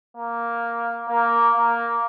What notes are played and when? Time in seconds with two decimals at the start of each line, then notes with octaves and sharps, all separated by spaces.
0.17 A#3
1.09 A#3
1.56 A#3